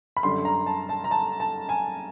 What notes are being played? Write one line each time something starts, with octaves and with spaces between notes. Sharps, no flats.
B5
F#2 D3 G3 C6
A#5
A5
A5
A#5
A5
A5
G#5